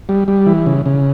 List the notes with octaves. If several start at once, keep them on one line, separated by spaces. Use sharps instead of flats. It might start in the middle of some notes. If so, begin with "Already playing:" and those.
G3
G3
E3
C#3
C#3